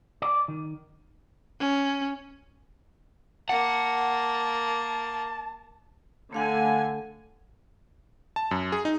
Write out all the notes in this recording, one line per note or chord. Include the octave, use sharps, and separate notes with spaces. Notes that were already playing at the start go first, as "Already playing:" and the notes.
D5
D#3
C#4
A#3 F#5 A5
D3 A3 F5 F#5 G#5
A5
F#2
G#4
D#4